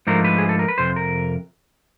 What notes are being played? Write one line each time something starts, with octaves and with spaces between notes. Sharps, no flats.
G#2 F3 A3 D4 A#4
B4
G#4
A4
A#4
B4
F2 C3 C5
A#4